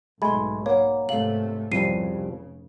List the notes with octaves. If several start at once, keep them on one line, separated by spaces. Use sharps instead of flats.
B1 G#2 G#3 A3 G#5 B5 C6
A#3 C#5 F#5
G#2 C3 A3 F5 F#7
F1 C2 C#3 F3 G3 C7 D#7